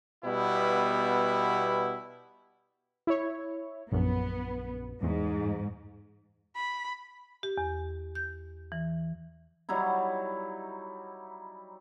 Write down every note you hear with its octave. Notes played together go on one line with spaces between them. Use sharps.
B2 G3 B3 E4
E4 C#5
A#1 F#2 B3
E2 G#2
B5
G4
E2
G6
E3
F#3 G3 D#4 E4